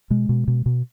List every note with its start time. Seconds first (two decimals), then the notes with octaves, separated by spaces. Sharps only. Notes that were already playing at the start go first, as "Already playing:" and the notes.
0.10 B2 G#3
0.29 B2
0.48 B2
0.66 B2